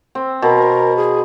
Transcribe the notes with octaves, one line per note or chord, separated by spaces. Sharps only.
C4
B2 A#4
G#4